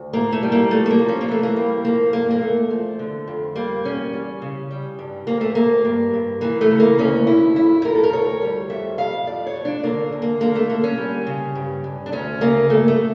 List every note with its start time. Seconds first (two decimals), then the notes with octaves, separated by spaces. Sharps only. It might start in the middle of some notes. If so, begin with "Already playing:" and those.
Already playing: D2
0.13 A2 A#3
0.32 A3
0.43 G3
0.52 A#3
0.71 F3 A3
0.86 A3
0.90 A#3
0.99 F3
1.08 C#4
1.21 A#3
1.28 E3 A3
1.43 A#3
1.56 G3
1.85 F3 A#3
2.13 G2 A#3
2.30 A#3
2.42 E2 A3
2.70 F3
2.99 D3
3.27 F2
3.56 G3 A#3
3.85 E2 C#4
4.13 G3
4.42 C#3
4.71 G3
4.99 G2
5.27 D2 A#3
5.41 A3
5.55 D2 A#3
5.85 G2
6.14 G2
6.41 E3 A#3
6.61 A3
6.71 C#3
6.80 A#3
6.99 D2 C#4
7.27 D2 E4
7.56 F2 E4
7.84 F2 A#4
7.95 A4
8.03 A#4
8.12 D2 C#5
8.42 G3
8.70 F2 E5
8.98 F2 F5
9.27 F2 D5
9.47 C#5
9.56 F2
9.65 D4
9.83 D3 A#3
10.12 E2
10.22 A#3
10.40 D3 A#3
10.55 A3
10.69 D3 A#3
10.84 C#4
10.98 G3
11.27 C#3
11.55 G2
11.84 G2
12.06 D4
12.12 D2 C#4
12.41 C#3 A#3
12.70 G2 A3
12.88 A3